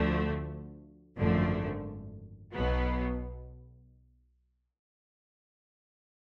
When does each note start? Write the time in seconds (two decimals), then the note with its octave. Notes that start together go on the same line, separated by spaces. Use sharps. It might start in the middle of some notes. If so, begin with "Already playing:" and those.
Already playing: D2 D3 F3 A3
1.17 G#1 F#2 D3 F3 A3
2.54 B1 B2 F#3 B3